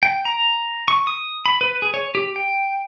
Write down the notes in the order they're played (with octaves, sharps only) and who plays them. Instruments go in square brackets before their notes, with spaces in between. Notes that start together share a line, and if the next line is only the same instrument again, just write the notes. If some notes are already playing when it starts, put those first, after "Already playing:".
[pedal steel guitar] G5
A#5
C#6
D#6
B5
B4
G#4
C#5
G4
G5